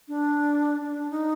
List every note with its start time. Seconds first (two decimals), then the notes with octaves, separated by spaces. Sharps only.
0.08 D4
0.81 D4
1.10 D#4